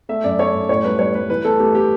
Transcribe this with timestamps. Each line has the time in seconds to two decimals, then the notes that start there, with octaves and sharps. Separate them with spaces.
0.09 A3 E5
0.24 F#2 D5
0.39 A3 C#5
0.54 F#2
0.69 A2 C#5
0.84 G3 B4
0.99 G3 C#5
1.14 G3 B4
1.30 E3 B4
1.45 A3 A4
1.59 A3 G4
1.75 A3 G4